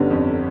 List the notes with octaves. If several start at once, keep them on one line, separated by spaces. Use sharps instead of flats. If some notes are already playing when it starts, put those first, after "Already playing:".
Already playing: G1 D3 G3 B3 C#4
F2